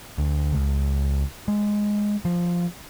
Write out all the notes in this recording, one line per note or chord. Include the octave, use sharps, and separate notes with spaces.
D2
C#2
G#3
F3